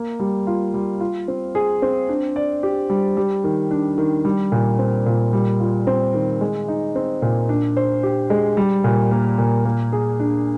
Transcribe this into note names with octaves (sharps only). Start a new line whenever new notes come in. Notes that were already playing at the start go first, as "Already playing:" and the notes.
Already playing: A#3
G3
F4
G3
F4
C4
G#4
C4
D4
D5
G4
G3
G3
D#3
D4
D#3
G3
A#2
C4
A#2
G3
F4
C4
D#3
G#3
D#4
C4
A#2
D4
C5
G4
G#3
G3
A#2
A#3
A#2
A#3
G#4
D4